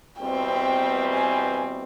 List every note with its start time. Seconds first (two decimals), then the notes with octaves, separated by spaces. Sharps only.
0.20 E2 B2 G3 C4 G5
1.14 G#5